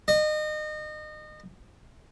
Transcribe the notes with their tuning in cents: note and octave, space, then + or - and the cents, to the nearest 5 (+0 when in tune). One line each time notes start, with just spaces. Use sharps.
D#5 -30